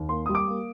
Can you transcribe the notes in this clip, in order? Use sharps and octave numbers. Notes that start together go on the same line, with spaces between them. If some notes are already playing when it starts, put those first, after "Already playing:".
Already playing: D#2
A#3 C6
G3 D#6
D6
A#3